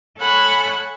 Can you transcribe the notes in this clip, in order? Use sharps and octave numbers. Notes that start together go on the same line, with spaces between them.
A4 C#5 F#5 G#5 B5